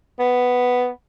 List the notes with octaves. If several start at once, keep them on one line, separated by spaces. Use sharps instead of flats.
B3